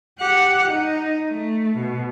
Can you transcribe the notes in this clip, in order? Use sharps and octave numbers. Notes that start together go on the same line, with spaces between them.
G4 F#5
D#4
A3
B2